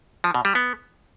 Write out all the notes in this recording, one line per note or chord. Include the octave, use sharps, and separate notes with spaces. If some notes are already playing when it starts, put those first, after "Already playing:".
F3
B2
G3
B3